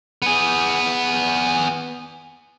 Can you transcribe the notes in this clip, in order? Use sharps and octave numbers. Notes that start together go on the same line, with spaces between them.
B3 G#4